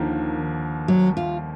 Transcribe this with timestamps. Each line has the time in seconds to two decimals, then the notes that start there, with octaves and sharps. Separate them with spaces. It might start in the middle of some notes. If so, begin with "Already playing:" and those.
Already playing: D#2 D3 D#3 F3 A#3
0.88 F#3
1.17 F4